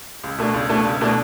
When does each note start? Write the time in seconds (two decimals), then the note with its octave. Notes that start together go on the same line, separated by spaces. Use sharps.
0.24 C#2
0.38 B2 A3 D4
0.54 C#2
0.69 B2 A3 D4
0.85 C#2
1.01 B2 A3 D4